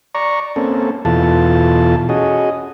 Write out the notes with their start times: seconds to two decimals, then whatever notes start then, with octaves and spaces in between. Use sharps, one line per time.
0.15 D5 A#5 C#6
0.56 A#3 C4 C#4 A4
1.05 E2 B2 E3 F4 A4 A5
2.09 C#4 F#4 G#4 D#5